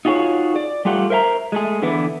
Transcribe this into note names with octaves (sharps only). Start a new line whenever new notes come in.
D#4 F4 F#4 G#4 C#5
D5
G3 A3 F4 G4 F#5
A#4 C5 E5 G5 A#5
G#3 A3 G#4
D3 E3 B3 E4